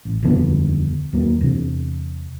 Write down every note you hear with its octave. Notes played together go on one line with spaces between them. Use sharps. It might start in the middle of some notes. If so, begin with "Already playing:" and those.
A1
D#1 F2 D3 B3
D#2 F#3 A#3
E2 C3